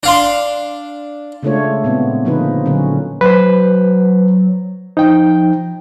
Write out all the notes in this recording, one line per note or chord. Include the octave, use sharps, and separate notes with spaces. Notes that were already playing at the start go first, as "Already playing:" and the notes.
D4 F5 C6
C#3 G#3 A3 D4 F4 C#5
A#2 G#3 B3 C4
A#2 D3 F3 A#3 D#4 B4
A#2 D3 F#3 C#4
F#3 B4 C5
F3 D#4 G5